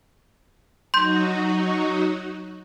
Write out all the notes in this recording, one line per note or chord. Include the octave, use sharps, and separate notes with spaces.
F#3 D#4 F#4 C6 G6